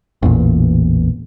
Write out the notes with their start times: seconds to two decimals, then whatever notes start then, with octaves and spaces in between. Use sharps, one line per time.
0.23 A1 E2 A#2